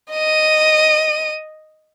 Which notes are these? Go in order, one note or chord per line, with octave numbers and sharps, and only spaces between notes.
D#5 D#7